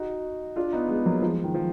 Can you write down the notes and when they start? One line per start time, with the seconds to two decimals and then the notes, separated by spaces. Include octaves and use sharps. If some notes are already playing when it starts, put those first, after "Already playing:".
Already playing: D#4 F#4
0.56 D4 F4
0.73 B3 D#4
0.89 G#3 B3
1.05 F#3 A#3
1.22 F3 G#3
1.33 F3
1.44 D#3
1.54 F3